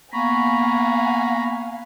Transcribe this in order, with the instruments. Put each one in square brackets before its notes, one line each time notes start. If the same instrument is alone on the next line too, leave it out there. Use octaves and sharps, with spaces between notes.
[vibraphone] A#3 B3 C#6 [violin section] F5 F#5 G#5 [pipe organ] A#5 B5